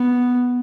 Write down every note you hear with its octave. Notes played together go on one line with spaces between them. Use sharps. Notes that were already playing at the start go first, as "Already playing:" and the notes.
Already playing: B3